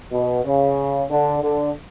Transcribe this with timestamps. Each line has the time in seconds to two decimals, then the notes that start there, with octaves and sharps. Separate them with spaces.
0.12 B2
0.45 C#3
1.11 D3
1.43 D3